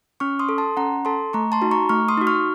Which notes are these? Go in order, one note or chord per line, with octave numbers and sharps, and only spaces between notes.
C#4 C#6 F6
C6 D#6
A4
A5 C6
C#4 F#5 A#5
A4 A5 C6
A3 A#5 C#6
A5 C6
D#4 F#4
A#5 C#6
A3 C#6 F6
C6 D#6
D#4 F#4
C#6 F6